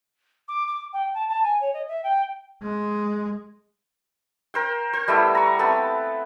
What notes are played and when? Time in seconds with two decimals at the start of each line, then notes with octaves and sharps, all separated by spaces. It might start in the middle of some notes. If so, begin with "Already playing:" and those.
0.48 D6
0.67 D6
0.93 G5
1.14 A5
1.28 A5
1.43 G#5
1.60 C#5
1.73 D#5
1.88 E5
2.03 G5
2.63 G#3
4.54 A#4 C5 G5
4.93 C5
5.08 G3 A3 B3 E4
5.35 A#5 C#6
5.59 A3 B3 C4 A5